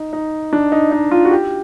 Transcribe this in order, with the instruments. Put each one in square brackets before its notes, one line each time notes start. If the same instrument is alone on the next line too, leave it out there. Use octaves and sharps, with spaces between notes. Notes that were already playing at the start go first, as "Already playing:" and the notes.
Already playing: [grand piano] D#4
D#4
D4
D#4
D#4
F4
F#4
G4